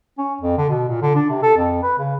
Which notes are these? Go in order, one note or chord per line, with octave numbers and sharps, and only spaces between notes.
C#4
F2
D3
B2
A#2
D3
D4
C3
A4
F2
B4
C#3